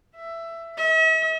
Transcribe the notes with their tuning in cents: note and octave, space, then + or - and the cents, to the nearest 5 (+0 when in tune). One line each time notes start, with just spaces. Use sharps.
E5 +15
E5 -45